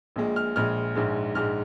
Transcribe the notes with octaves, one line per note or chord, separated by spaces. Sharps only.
A#1 A#2 G#3
F6
A#1 A#2 G#3 F6
A#1 G#2 G#3
A#1 G#2 G#3 F6